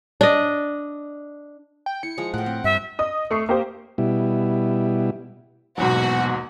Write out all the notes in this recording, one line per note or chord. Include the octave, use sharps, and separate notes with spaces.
D4 D#5
G5
E4 C#7
F3 G#3 A#5
A2 A#4 F#5 G5
C4
G2 E5
D#5 D#6
A3 C#6 C7
A#3 G4 C5
B2 G3 E4
D#1 E2 G#2 B2 F#3 F#4